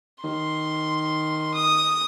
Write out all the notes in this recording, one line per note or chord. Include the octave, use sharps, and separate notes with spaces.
D#3 C6
D#6